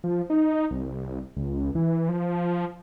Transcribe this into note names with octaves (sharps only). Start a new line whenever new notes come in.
F3
D#4
C2
C#2
E3
F3